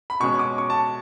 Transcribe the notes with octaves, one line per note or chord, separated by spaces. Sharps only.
B5
B2 G#3 C#4 C#6
D6
C#6
A5